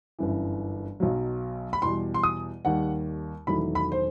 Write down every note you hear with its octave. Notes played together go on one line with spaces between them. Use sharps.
G1 F#2 E3
B1 B2 F#3
B5
E2 B2 G3 C6
C6
D#6
D#2 D#3 G3 F#5
E1 E2 D#3 F#3 A3 B5
B5
C5